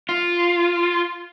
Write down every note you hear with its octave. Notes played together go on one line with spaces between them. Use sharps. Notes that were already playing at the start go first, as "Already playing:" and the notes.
F4